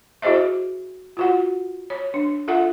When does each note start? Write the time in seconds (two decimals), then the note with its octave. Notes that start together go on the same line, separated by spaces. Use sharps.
0.22 E4 F#4 G#4 C5 D#5 E5
1.17 F4 F#4 F#5
1.90 C#5
2.14 D4
2.48 F4 A4 E5 F#5